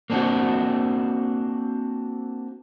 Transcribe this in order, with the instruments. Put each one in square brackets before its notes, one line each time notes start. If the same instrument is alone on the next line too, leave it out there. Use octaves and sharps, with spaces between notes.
[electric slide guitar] A#3 C4 D4 F4 F#4